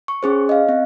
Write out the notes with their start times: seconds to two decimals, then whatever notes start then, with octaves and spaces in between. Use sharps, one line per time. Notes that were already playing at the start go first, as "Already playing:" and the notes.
0.08 C#6
0.23 C#4 G#4 C5
0.49 D#5 F5
0.69 C4